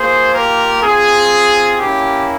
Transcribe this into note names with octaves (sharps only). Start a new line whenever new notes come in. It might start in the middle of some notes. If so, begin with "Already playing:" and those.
Already playing: A#3 F4 G#4 C5
G4 A#4
C4 F4 G#4
A#3 C#4 E4 G4